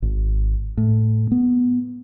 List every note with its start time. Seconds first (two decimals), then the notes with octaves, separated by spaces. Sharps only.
0.02 G#1
0.77 A2
1.31 B3